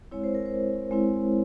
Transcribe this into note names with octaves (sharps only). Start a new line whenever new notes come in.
G#3 C4 E4 C#5
C5
A#4
C5
G#3 C4 E4